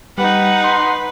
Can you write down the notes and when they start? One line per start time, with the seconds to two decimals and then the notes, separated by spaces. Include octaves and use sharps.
0.18 G3 D#4 B4 F#5
0.64 C6